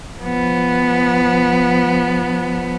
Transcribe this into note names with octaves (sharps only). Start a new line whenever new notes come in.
F3 B3